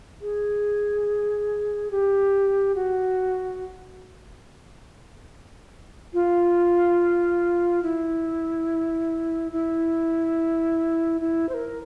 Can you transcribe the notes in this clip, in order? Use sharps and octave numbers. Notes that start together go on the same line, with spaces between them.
G#4
G4
F#4
F4
E4
E4
E4
C5
A#4